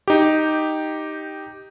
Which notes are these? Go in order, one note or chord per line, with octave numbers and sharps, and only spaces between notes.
D#4 G4